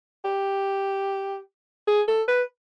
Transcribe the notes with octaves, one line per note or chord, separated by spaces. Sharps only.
G4
G#4
A4
B4